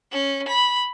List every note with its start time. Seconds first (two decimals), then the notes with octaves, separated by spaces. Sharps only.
0.12 C#4
0.47 B5